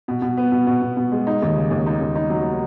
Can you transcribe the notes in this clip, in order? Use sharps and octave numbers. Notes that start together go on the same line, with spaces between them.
B2
B2
B3
B2
B2
B2
B2
G#3
D#4
D#2
C#3
D#2
D#4
D#2
D#4
F#3